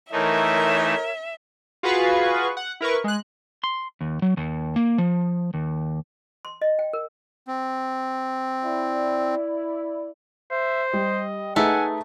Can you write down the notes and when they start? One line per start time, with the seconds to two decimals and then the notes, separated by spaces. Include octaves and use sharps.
0.12 E3 A3 D#4 A#4 C#5 E5
1.83 F4 F#4 G#4 B4 F5 C#6
2.57 F#5
2.81 E4 A#4 B4 C#6
3.04 G#3 F#6
3.64 C6
4.01 D#2
4.22 F#3
4.37 D#2
4.76 A#3
4.98 F3
5.54 D#2
6.45 C6
6.62 D#5
6.79 G5
6.93 A#4
7.48 C4
8.65 E4 D5
10.51 C5 E5
10.93 G3 D#5
11.56 A3 D#4 G#4 B4 F#5 G#5